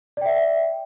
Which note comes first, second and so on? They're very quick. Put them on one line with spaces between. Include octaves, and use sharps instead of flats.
D5 G5 E5